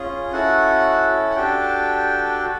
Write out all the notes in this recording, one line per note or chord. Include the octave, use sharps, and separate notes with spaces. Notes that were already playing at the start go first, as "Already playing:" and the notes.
Already playing: C#4 F4 G#4
C#4 E4 F#4 A4 F#5
F#5
D4 F#4 G4 A4 G5
F#4 A4